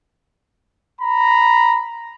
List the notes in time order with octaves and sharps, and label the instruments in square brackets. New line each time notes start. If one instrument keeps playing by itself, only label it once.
[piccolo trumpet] A#5 [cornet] B5